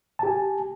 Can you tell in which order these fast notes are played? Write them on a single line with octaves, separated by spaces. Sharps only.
A5 G4 G#5